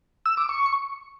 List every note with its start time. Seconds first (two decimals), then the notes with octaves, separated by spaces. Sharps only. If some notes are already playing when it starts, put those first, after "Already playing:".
0.26 E6
0.37 D6
0.49 C#6